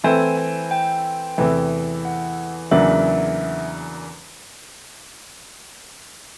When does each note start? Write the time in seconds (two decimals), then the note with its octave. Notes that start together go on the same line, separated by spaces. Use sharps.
0.04 E3 A3 C4 E4 A4 G#5
0.38 G#5
0.71 G5
1.37 E2 C3 E3 A3
2.05 F#5
2.71 E2 C#3 F#3 A#3 D4 E5